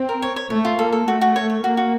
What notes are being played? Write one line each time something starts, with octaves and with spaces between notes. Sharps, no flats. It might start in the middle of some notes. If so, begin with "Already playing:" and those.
Already playing: C4
A#4
C#5
C#5
A3 C#5
F4
A#3 A4
A4
A3 F#4
F#4
C#5
C#5
A#3 F#4
F#4